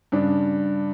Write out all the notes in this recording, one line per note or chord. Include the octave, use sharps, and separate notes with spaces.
G2 C#3 D4